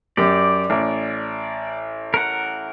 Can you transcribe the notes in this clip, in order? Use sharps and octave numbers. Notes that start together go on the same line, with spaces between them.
F#2 G4 D5
A1
A#4 F#5